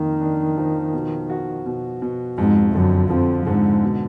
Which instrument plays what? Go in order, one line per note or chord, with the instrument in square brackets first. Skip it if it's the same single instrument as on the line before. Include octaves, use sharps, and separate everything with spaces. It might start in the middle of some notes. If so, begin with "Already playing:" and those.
Already playing: [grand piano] F2 A#3 [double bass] D#3
[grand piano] D4
F3
B2
F#4
B2
B2
[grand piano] F2 [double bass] G#2
[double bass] F#2 [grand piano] D3
[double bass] F2 [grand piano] F3
[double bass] G#2 [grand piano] D3
[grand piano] B2